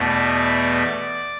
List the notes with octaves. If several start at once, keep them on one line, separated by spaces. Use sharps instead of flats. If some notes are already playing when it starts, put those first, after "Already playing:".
Already playing: E2 B2 A3 D5